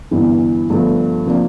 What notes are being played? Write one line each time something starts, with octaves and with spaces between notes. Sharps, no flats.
G1 G2 E3
G1 G2 F3 A3
C3 F3 A#3 D4